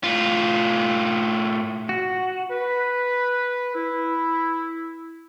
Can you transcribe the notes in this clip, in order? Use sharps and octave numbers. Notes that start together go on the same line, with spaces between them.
A2 F4
F#4
B4
E4